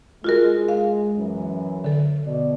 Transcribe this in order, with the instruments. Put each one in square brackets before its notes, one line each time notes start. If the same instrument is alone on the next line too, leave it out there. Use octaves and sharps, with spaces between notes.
[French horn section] G#3 [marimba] F4 F#4 A#4
[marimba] F5
[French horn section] F#2 E3
[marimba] D3 A4
[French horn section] B2 D5